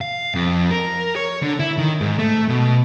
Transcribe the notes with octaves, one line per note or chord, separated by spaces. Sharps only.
F5
F2
A#4
C#5
D3
E4
D#3
G#2
A3
B2